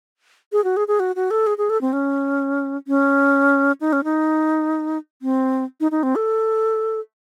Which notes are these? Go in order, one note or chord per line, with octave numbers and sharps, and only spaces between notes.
G#4
F#4
G#4
G#4
F#4
F#4
A4
G#4
G#4
A4
C4
C#4
C#4
D#4
C#4
D#4
C4
D#4
D#4
C4
A4